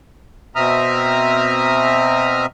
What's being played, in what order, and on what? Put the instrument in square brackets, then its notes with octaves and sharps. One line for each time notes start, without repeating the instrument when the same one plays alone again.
[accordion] B2 C4 E5 A#5 D#6 F6